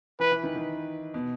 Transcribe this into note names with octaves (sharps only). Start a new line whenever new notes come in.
E3 B4
E3
D#3
D#3
B2